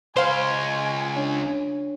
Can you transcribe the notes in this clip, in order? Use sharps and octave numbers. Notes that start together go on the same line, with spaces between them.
C#2 C5 F5 G#5 C6
D4 C#5